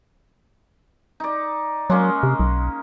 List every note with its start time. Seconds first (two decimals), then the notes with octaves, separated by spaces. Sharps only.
1.20 D#4 D5
1.90 F#3 G#3 A#3 C#4
2.23 C3
2.40 B1